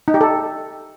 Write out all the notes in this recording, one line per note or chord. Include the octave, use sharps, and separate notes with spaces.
D#4
G4
A4